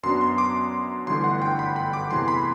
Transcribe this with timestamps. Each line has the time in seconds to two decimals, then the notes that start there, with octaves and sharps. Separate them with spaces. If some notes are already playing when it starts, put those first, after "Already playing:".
0.03 F#2 F#3 B3 D4 C6
0.21 C6
0.38 D6
1.07 G1 G2 E3 A3 C6
1.24 F#5
1.42 G5
1.59 B5
1.76 B5
1.93 D6
2.10 E2 C3 E3 A3 C6
2.28 B5